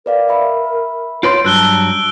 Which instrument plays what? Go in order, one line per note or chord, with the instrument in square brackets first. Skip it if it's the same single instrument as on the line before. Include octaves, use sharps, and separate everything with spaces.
[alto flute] A#4 [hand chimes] B4 D5 F5
[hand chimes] E5 B5
[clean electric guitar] F4 B4 C6 [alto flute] C#5 [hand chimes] F6 G6 A6 [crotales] D7
[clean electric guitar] G2 F#3 [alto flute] A5 [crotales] E6 F#6 G7